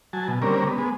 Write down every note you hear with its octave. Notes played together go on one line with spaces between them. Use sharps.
F#3 G#5 A5
B2
D3 G3 A#3 C4 C#4 A#4
B3
G#3 B3